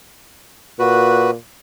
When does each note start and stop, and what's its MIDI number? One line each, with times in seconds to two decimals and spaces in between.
0.79 1.35 46
0.79 1.31 66
0.79 1.31 71